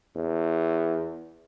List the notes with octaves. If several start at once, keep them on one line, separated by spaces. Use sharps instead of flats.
E2